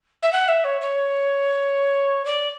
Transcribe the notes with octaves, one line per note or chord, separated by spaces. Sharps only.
E5
F#5
E5
C#5
C#5
D5